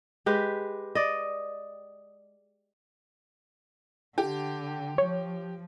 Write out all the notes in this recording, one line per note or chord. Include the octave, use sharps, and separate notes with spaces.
G#3 G4 B4
D5 D#5
D3 G4
F3 C#5